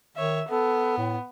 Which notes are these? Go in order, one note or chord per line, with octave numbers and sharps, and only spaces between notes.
D#3 C#5 E5
B3 A4
A2